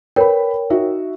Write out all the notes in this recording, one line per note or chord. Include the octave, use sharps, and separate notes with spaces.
A#4 B4 C#5 G5 B5
D#4 F#4 E5